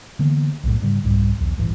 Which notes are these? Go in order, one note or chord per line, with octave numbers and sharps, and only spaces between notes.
D3 E3 A#3 B3
B1 F2 A2
G#2 C#3 G3
C2 F2 G#2 G3
B1 E2
D#1 A1 G2 E3